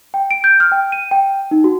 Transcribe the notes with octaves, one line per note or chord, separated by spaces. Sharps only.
G5
D7
G6
F6
G5
D#7
G5
D#4
F#4